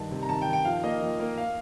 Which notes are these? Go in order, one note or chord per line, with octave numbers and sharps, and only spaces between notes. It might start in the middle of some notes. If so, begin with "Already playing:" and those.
Already playing: G2 D#3 A5
C3
A#5
D#3 A5
G5
D#3
G5
F3 F5
A#3 D#5
F3
A#3
F5